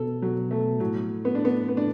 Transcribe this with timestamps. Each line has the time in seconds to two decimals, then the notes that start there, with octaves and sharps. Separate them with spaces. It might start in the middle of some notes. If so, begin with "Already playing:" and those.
Already playing: B2 A4
0.22 F#3
0.51 A3
0.80 A2 F#3
1.25 B3
1.35 D4
1.45 B3
1.69 B3
1.77 D4